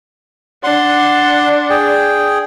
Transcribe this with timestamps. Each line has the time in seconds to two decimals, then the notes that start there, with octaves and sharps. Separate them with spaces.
0.64 D4 F#5 C6
1.70 G#4 G5